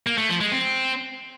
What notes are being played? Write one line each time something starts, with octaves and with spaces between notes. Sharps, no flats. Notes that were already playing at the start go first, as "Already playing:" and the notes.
A#3
A3
F3
G#3
C4